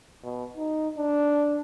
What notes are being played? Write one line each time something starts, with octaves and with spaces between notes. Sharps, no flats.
B2
D#4
D4